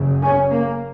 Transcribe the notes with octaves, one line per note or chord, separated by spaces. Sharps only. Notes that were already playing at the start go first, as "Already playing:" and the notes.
Already playing: F#1 F#2 C#3
C#4
A#3